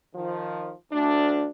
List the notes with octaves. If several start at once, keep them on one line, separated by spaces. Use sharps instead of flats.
D#3 F3
D2 D4